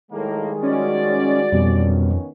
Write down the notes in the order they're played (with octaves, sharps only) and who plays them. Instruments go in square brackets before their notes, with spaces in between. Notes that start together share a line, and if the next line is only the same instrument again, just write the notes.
[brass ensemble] A2 A#3 [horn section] D#3 G3 G#3
[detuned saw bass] C#4 [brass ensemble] F#4 D5
[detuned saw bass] F2 [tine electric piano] B2 G3 [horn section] D#3 B3 C#4